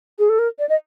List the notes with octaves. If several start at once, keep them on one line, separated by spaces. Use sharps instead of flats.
G#4
A4
A#4
D5
D#5